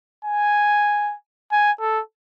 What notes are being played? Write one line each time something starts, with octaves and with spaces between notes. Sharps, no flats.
G#5
G#5
A4